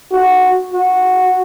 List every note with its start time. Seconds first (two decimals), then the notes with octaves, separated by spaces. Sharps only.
0.12 F#4
0.74 F#4